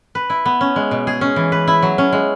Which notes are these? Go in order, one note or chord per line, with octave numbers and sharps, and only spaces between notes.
B4
E4
B3
C#4
G#3
B2
G#4
C#4
E3
B4
E4
F#3
C#4
G#3